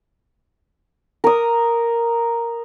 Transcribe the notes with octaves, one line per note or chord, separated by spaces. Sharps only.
A#4 D#6